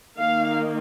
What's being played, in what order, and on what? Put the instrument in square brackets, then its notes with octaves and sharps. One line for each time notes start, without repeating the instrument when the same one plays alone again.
[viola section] D#3 A#3 D#4 F5